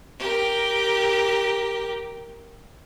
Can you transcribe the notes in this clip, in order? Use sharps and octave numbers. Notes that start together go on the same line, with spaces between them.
G4 A#4